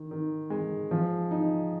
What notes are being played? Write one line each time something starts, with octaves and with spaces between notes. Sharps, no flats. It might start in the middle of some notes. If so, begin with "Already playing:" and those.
Already playing: D#3
D#3
G#3
F3
D#4